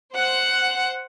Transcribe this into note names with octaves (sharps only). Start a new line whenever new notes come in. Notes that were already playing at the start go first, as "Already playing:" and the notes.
C5 F#5 F#6